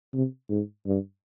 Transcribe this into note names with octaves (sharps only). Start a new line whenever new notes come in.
C3
G#2
G2